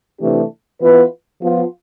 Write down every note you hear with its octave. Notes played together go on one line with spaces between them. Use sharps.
C3 E3 A3 D4 G4
E3 B3 F4 B4
F3 B3 F4